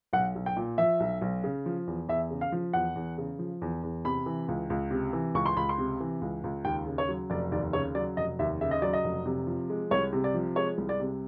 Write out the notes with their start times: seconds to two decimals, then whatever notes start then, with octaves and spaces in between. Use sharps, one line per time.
0.13 B1 F#5
0.35 B1
0.46 G5
0.57 A#2
0.78 F3 E5
1.00 B1
1.22 B1
1.44 C#3
1.66 F3
1.87 E2
2.08 E2 E5
2.31 C#3
2.41 F5
2.52 F3
2.73 E2 F#5
2.95 E2
3.18 C#3
3.39 F3
3.62 E2
3.83 E2
4.05 C3 B5
4.26 E3
4.48 C#2
4.70 C#2
4.91 C3
5.13 E3
5.34 C#2 C#6
5.46 C6
5.56 C#2 B5
5.69 C6
5.78 C3
6.00 E3
6.21 C#2
6.44 C#2
6.65 D#2 G5
6.87 C#3
6.98 C#5
7.09 F#3
7.30 F1 D5
7.52 D#2 D5
7.73 C#3 C#5
7.95 F#3 D5
8.17 F1 D#5
8.39 D#2 E5
8.61 C#3 E5
8.71 D#5
8.82 F#3 D5
8.93 D#5
9.04 F1
9.26 C3
9.47 F3
9.70 G#3
9.91 C2 C#5
10.13 C3
10.24 D5
10.34 F3
10.56 G#3 C#5
10.78 C2
10.89 D5
11.00 C3